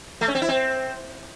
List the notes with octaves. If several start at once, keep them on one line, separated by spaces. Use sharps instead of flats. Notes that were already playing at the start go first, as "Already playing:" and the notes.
A3
C#4
C4
E4
C4